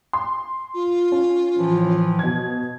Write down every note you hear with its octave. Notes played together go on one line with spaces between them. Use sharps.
C6
F4
C#4
A2 E3 F3
B2 G#6